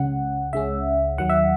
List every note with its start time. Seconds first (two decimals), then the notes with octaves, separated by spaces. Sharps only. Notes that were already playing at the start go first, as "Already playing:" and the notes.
Already playing: C#2 C#3 G#3 C#4 F#5
0.53 C#2 C#3 G#3 C#4 E5
1.18 D#2 D#3 F#3 F#5
1.30 E5